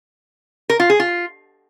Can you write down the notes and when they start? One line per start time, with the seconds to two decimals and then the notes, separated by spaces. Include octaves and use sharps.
0.70 A#4
0.80 F4
0.90 G#4
1.00 F4